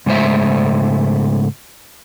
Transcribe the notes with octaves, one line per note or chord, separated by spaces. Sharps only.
G#2 C#3 G#3 A3 C5 E5